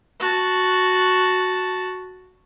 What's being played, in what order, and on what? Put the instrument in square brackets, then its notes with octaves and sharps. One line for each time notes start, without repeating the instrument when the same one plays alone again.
[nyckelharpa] F#4 A5